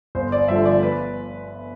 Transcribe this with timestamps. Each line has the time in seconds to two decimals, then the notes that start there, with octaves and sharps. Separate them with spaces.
0.15 G1 C5
0.32 D5
0.48 G2 D3 F3 A3 E5
0.65 D5
0.83 B4